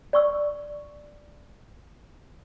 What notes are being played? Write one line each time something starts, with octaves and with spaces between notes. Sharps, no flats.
D5 C#6 E6